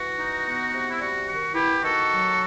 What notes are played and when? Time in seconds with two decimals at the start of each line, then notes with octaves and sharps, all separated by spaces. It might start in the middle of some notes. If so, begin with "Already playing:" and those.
Already playing: E3 F#4
0.18 D#4
0.44 B3
0.72 C3
0.89 E4
1.00 G3 F#4
1.28 D#3 F#4
1.54 B3 E4 G4
1.83 D#3 F#4 A4
2.11 F#3